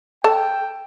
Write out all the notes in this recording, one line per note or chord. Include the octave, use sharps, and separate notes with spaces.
A4 G5 A5